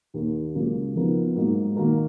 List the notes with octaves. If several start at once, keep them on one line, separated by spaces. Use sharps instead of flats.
D#2 D#3 A#3
C#2 C#3 F#3 A#3 C#4
F2 F3 B3 D#4 A#4
G#2 F#3 A#3 D#4
D#3 A#3 D#4 F#4 A#4